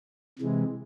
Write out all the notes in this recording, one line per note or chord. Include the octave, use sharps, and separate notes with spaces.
C3 E3 G#3